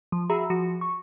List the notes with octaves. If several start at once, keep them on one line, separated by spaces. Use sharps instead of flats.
F3
F#4 G#4 E5 A#5 B5 E6
F3 F#4
C#6